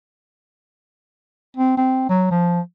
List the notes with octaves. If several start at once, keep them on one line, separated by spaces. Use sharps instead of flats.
C4
C4
F#3
F3